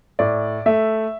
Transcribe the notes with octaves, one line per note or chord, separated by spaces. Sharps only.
A2 D5
A3 E5